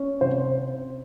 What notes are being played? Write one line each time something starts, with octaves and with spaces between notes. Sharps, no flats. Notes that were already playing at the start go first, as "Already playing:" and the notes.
Already playing: C#4
C3 C5